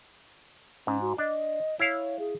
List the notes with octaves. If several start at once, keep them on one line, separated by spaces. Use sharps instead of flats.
G#2 C#4
F#4
D4 D#5
E4 C#5 F5
G#4